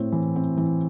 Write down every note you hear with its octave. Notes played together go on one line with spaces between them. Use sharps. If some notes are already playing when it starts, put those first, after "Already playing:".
Already playing: A2 C4
E3
C4
E3